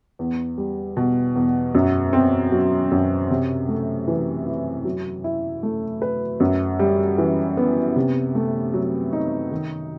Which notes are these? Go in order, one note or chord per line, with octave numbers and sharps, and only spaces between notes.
E2
G3
B2
E2
F#2
C4
F#3
F#2
C3
A3
E3
E4
F#3
E4
A3
B4
F#2
G3
E3
B3
C3
A3
F#3
D#4
D#3